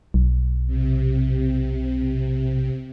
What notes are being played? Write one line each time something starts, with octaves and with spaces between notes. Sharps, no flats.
B1
C3